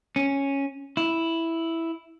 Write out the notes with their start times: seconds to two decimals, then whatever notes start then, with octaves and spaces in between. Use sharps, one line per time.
0.16 C#4
0.97 E4